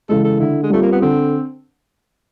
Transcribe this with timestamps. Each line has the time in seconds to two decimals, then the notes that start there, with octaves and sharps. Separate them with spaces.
0.09 C#3 E3 G#3 A4
0.24 A4
0.40 D3 E4
0.63 G#3
0.70 G3 A3 C4 F4
0.83 A#3
0.92 B3
1.01 D3 C4